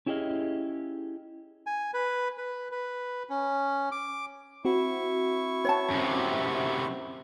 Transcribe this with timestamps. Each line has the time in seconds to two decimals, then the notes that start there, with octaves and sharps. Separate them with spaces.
0.06 C#4 E4 G4 G#4 D#5 F5
1.67 G#5
1.94 B4
2.38 B4
2.71 B4
3.29 C#4
3.92 D6
4.65 C4 E4 F#4 C#6
5.65 C#5 F#5 A5
5.90 F#2 C3